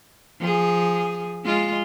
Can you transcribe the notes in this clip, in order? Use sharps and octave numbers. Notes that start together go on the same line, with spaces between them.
F3 G#4
G#3 F4